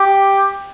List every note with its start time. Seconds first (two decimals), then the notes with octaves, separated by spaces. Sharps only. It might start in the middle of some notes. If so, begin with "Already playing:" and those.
Already playing: G4